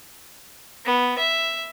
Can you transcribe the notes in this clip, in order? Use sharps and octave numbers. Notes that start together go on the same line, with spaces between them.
B3
E5